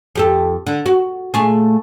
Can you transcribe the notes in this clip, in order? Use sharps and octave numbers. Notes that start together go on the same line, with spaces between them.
F2 G4 A4
D3
F#4
A#2 A3 G#4